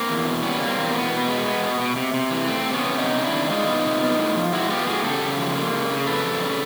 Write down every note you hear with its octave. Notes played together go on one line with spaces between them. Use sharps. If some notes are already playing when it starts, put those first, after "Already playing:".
Already playing: A#3 C4
E2
B2
G3 B3 C#4
A#3
C4
E2
B2 B3
B2
G#3
B3
B2
B2
C3
C3
E3
A3 C4
C3
B3 C#4
C3
B3 C#4 D#4
C3
D4 E4
D#3
G#3 D#4 F4
B3
C3
B3
A2
F3
G#3 E4 F#4
B3 F4 G4
A2 F#4 G#4
C#3 G4 A4
C#3
F3
A#3
C#3
C#3
F2 A4 B4
F2
C#3